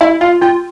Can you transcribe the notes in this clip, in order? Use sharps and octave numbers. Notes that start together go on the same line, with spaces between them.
E4 E5
F4 F5
F4 G5